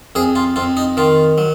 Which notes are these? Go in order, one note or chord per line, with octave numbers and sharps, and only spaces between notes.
F2 G#4
F4
F2 F4
D#4
D#3 F4
F#3